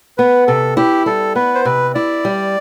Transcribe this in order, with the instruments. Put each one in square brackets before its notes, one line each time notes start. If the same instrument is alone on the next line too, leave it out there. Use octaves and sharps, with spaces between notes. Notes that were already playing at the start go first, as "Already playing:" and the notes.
[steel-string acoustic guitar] B3 [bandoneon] B4
[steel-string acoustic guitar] C3 [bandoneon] A4
[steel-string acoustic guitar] E4 [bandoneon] G4
[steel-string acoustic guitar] G3 [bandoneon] A4
[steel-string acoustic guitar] B3 [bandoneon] B4
[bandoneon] C5
[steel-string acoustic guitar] C3 [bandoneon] B4
[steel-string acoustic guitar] E4 [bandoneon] D5
[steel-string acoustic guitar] G3